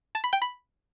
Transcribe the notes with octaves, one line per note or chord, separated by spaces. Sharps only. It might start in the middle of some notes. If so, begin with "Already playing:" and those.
A5
B5
G5
B5